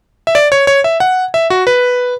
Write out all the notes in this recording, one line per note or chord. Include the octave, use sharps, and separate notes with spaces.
E5
D5
C#5
C#5
E5
F#5
E5
F#4
B4